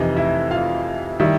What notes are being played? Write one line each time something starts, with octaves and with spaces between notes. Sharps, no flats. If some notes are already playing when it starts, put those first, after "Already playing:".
Already playing: F2 C3 E3 D#4 D#5
E4 E5
F4 F5
D#3 G3 E4 E5